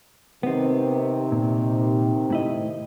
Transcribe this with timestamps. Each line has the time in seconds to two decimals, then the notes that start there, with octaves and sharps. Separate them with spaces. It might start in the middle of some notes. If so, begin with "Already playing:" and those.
0.43 C3 D#3 B3 C4
1.32 A#2
2.30 A2 E4 D#5